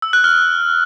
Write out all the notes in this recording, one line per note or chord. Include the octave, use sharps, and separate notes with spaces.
E6
F#6
F6